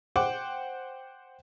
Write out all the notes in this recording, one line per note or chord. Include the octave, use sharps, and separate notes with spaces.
C5 F#5 G5 D6